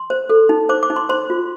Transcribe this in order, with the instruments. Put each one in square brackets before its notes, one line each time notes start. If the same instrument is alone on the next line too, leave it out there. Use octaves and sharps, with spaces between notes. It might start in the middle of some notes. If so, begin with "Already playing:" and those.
Already playing: [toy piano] C6
C5
A4
D#4
C5 D6
D6
D#4
C6
C5 C6
F4